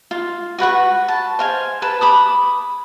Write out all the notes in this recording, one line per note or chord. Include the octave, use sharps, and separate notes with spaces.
F4
F#4 B4 F#5 C#6
A5
C5 F5 G#5
B4 A5
B5 D6 D#6